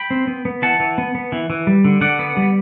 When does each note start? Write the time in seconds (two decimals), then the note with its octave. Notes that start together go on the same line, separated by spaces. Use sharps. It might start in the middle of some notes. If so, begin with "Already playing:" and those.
Already playing: G5 B5
0.11 C4
0.27 B3
0.45 B3
0.62 E3 F#5 A5
0.80 E3
0.98 B3
1.15 B3
1.32 E3
1.50 E3
1.67 G3
1.85 D3
2.01 D3 D5 F#5
2.19 B3
2.37 G3